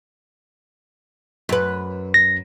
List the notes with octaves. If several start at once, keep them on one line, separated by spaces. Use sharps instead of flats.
F#2 B4
A#6